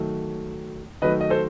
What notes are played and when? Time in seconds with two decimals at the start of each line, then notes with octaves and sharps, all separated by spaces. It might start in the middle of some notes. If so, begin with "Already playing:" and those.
Already playing: D#3 F#3 A3
1.02 D#3 F#3 A3 B4 D#5
1.21 D#5
1.30 A4 C5